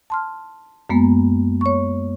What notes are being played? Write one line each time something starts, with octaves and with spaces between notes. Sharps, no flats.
A5 C6 F6
F#2 G#3 A#3 B3
C#5 C#6